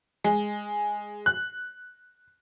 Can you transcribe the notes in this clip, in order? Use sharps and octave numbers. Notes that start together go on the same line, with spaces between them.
G#3
F#6